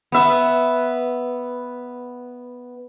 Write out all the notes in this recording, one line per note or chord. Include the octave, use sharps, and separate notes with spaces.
B3 E5